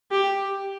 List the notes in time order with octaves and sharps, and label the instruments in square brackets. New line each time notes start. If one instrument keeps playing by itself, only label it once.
[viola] G4